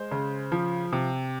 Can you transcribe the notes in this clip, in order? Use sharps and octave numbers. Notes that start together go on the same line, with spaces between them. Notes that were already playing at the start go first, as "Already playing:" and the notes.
Already playing: G#3 C5
C#3
F3
C3